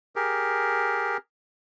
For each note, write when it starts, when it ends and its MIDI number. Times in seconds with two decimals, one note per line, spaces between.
0.16 1.17 67
0.16 1.17 68
0.16 1.17 70